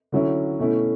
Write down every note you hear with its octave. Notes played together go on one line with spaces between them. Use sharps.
D3 F#3 C#4 E4
B2 A3 C#4 E4